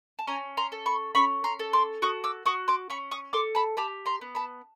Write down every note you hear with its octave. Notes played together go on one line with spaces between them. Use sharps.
A5
C#4 G#5 A#5
A#5 C6
A4
B5 C#6
C#4 B5 C#6
A#5 C6
A4
C6 D6
F#4 C#6 D#6
D6 E6
F#4 C#6 D#6
C6 D6
C#4 B5 C#6
C#6 D#6
A4 C6 D6
A5 B5
G4 A5 B5
A#5 C6
B3
A5 B5